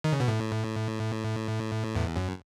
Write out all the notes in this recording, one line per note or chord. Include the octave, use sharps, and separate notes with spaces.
D#3
C#3
B2
A2
E2
F#2